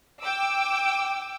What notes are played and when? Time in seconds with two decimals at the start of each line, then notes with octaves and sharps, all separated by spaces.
0.23 G5 D6 E6